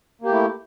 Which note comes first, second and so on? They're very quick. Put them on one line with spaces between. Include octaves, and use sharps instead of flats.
A#3 G4 A3 E4